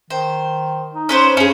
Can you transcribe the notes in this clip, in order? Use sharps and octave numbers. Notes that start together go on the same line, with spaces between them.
D#3 C5
D#4
C#4 B4 C5
G2 C#4 G#4